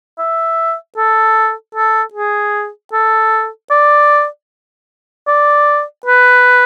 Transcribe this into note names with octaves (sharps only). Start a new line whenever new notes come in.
E5
A4
A4
G#4
A4
D5
D5
B4